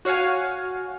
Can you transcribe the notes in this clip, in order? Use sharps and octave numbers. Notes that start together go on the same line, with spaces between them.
F#4 C#5 F5 F#5 G#5